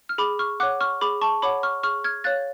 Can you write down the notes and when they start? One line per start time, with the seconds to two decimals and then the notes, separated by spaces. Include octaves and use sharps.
0.09 F6
0.18 G#4 B5 D6
0.39 C#6 F6
0.60 F#5 D6 F#6
0.63 C#5
0.81 C#6 F6
1.01 G#4 B5 D6
1.21 A5 C#6
1.42 C#5 F#5 B5 D6
1.63 C#6 F6
1.83 G#4 C#6 F6
2.04 F6 G#6
2.24 C#5 F5 F#6 A6